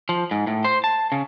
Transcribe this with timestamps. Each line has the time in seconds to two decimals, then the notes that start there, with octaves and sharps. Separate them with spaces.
0.09 F3
0.31 G#2
0.47 A2
0.64 C5
0.84 A5
1.12 C#3